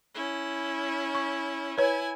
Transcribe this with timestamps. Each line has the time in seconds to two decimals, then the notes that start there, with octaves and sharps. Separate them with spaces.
0.15 C#4 E4
1.15 C#6
1.78 E4 B4 C#5 G#5